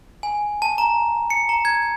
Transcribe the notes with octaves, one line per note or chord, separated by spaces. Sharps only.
G#5
A5
A#5
C#7
A#5
G#6